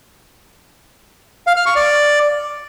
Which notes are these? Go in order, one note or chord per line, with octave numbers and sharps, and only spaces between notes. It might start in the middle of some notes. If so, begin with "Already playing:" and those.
F5
F6
C#6
D5